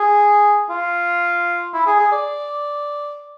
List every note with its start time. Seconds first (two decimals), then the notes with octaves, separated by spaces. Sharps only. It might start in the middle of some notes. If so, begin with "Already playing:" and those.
Already playing: G#4
0.70 F4
1.74 E4
1.87 G#4
2.00 G#4
2.12 D5